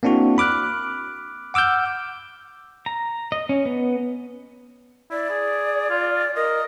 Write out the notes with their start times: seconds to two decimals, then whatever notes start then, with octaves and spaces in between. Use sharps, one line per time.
0.03 A#3 C4 D4 E4 F#4
0.38 B5 D6 F6 F#6
1.54 F#5 D6 E6 F6 G6
2.86 A#5
3.32 D#5
3.49 C#4
3.66 B3
5.10 E4 D5
5.30 G#4
5.90 F4
6.36 A#4 D#5